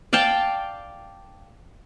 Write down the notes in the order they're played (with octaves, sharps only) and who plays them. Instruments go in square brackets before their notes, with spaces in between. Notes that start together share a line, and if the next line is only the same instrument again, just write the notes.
[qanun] D5 F5 G5 A5